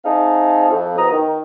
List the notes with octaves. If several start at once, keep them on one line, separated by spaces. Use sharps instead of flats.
C4 D#4 G#4 E5 F5 A5
F2
E2 B2 F3 B3 A#5 D#6
D#3